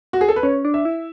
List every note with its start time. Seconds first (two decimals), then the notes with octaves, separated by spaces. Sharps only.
0.13 F#4
0.21 G#4
0.28 A4
0.36 B4
0.43 C#4 C#5
0.65 D4
0.74 E5
0.85 E4